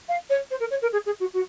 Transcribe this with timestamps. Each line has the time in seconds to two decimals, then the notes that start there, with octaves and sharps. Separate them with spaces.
0.08 F5
0.29 C#5
0.50 C5
0.60 A#4
0.70 C#5
0.82 A#4
0.92 G#4
1.05 G#4
1.19 F#4
1.33 F#4